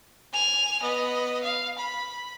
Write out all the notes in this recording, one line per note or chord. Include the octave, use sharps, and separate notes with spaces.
G#5 F7
B3 D#5
F5
B5